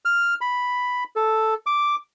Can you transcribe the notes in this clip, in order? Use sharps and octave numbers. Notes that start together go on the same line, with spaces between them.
F6
B5
A4
D6